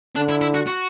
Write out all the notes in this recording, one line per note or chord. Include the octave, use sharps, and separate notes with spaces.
D3 D4
E4
E4
F#4
F#4